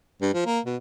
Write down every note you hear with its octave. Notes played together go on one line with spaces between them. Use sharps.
G2
F3
A#3
B2